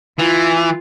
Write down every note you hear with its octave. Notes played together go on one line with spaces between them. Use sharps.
E3 F4